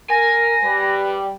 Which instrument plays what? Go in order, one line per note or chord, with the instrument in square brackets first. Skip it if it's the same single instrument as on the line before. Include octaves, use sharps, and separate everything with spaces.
[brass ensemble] A#4 [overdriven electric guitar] G#5 [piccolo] A#6
[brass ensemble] G3 [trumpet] B4